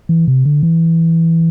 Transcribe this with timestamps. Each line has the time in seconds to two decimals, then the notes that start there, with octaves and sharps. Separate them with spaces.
0.09 E3
0.28 C3
0.45 D3
0.63 E3